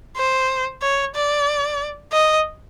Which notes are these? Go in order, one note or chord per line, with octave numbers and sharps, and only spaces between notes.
C5
C#5
D5
D#5